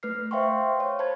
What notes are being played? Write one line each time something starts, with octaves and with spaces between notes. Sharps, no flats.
A3 B4 F6 C7
C5 E5 F5 G5 C6 C#6
C#5
C5 A5 B5 G#6